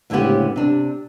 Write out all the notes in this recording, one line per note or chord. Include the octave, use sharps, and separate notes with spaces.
D2 A2 C#3 G#3 B3 G4
C3 D4